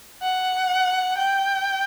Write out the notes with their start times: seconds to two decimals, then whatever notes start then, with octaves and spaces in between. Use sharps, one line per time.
0.22 F#5
1.18 G5